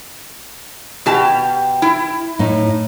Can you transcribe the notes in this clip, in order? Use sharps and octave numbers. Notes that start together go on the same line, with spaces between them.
B2 G4 A5
E4
A2 D#4